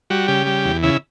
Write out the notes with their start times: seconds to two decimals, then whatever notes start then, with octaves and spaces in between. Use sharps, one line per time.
0.10 G3 F#4
0.28 C#3 G4
0.47 G3
0.65 E2
0.83 C#3 E4